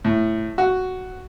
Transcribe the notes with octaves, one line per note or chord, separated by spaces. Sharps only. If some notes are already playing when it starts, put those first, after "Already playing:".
A2
F#4